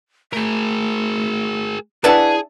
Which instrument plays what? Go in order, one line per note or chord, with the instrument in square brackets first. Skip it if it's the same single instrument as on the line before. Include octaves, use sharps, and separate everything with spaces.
[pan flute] A3 [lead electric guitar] G#4 A#4
[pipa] D4 E5 A5 [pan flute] E4 [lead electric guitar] G#4 [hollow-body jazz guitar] B4 F#5